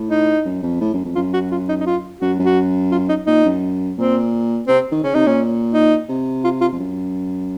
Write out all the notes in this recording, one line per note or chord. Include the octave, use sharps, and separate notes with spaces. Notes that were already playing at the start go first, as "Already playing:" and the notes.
Already playing: A2
D#4
F#2
F2
A2
F#2
F2
F#2 F4
F#4
F4
D#4
D#4
F4
F#2 F#4
F#2
F#4
F4
D#4
A#2 D#4
F#2
A#2 C4
C3 C4
D#3
C#3 C#4
C3 D#4
A#2 C#4
D#4
C3
F4
F4
F2
F#2